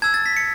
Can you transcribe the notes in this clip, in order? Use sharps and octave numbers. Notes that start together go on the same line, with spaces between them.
A5 E6 G#6
A6
B6
C#7